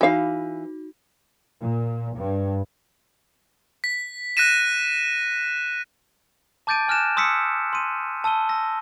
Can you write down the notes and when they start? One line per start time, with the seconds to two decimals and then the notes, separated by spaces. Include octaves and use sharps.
0.01 E3 D#4 F#4 F5
1.60 A#2
2.17 G2
3.84 B6
4.37 F#6 A#6 B6 D#7 E7
6.67 A5 D6 G6 A6 D7 D#7
6.88 G#5 F6 F#6 A#6 E7
7.17 C6 D#6 E6 B6 C#7
7.73 C6 D#7
8.24 A5 E6 D#7 G7
8.49 E6 A#6